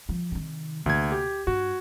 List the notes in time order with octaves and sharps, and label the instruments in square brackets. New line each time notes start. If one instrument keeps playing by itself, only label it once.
[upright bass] F3
C3 D#3
[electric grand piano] D2 G#6 [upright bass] C3 A#3
[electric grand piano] G4
[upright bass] G2 [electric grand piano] F#4